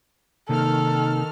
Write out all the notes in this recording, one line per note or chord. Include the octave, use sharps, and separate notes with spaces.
C3 D#3 A#3 D#4 A4 F6